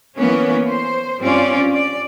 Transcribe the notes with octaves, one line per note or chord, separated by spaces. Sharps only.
E3 A#3 B3 C#4
C5
G2 C4 C#4 F4 D5
D5